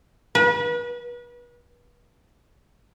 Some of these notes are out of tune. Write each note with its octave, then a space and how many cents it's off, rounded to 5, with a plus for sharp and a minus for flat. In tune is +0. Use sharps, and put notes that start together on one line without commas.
B4 -35